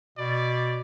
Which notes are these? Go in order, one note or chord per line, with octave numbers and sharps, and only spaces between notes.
B2 D5